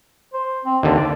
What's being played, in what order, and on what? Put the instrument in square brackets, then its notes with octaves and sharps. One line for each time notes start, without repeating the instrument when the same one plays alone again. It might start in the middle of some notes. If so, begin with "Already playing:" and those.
[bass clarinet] C5
C4
[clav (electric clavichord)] D#2 D3 [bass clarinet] A#3
[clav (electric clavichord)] D5